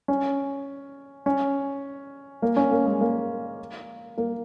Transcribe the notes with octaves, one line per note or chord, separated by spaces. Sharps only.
C#4
C#4
A#3
C#4
A#3
G#3
A#3
A#3